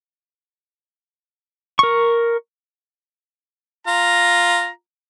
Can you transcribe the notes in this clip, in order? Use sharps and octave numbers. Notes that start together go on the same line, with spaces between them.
A#4 C#6
F4 A#5